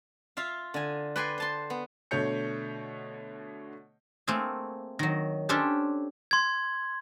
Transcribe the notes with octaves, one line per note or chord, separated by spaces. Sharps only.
F4 E5 F5
D3 G#5
B4 D5 G5 G#5 C6
C5 A5 C6
B3
B2 D3 A3 C#5 G6 C#7
A3 A#3 C4 G#4
D#3 F#3
C#4 D4 G4 A4 C5 A5
C6 G#6